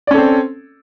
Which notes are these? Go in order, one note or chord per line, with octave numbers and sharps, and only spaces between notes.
C4 C#4 A4 D5